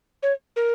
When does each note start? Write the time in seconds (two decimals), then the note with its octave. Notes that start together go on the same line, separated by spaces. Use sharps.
0.23 C#5
0.56 A#4